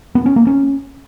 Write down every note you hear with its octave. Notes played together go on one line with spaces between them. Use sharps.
B3
C#4
A#3
C#4